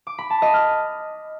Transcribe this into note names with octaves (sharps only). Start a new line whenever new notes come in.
D6
B5
A5
D#5
F6